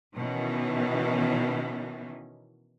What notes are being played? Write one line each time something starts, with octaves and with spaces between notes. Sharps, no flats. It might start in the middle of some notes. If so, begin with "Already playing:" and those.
B2 D#3 E3 C#4